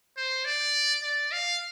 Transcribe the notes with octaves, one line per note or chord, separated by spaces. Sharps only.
C5
D5
D5
F5